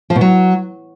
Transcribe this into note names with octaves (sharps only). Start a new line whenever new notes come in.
F3
B2
F#3